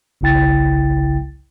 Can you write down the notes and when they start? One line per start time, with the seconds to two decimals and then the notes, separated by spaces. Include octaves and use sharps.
0.21 G1 C2 C#3 E4 G5 A6